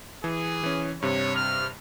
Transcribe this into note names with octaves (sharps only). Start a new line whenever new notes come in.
E3 G#4
E3 C#4
G2 C3 C#5
F6